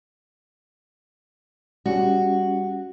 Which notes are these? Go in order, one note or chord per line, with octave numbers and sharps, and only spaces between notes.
G3 C#4 F#4